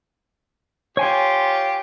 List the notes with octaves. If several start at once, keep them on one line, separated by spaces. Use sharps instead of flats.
F4 G4 C#5 G#5 C6